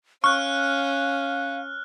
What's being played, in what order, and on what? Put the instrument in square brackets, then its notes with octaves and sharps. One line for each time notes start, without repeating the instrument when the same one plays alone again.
[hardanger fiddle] C#4 [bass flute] F5 [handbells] C#6 [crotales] F6 F#6